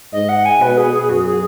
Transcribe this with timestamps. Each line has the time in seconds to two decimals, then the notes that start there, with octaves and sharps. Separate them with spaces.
0.12 G#2 D#5
0.28 F#5
0.45 G#5
0.60 B2 B4
0.77 G#4
0.93 G#4
1.09 F#2 F#4
1.25 G#4